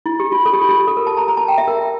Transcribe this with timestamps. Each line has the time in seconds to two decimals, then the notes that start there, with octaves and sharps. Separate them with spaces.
0.06 E4
0.20 G4
0.32 F4
0.46 A4
0.53 G4
0.61 F4
0.69 G4
0.87 A4
0.97 A#4
1.07 A5
1.17 A#5
1.28 A#5
1.37 A5
1.48 G5
1.58 E5
1.68 A#4